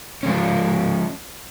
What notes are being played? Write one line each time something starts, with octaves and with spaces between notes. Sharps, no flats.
F3 G#3 C#4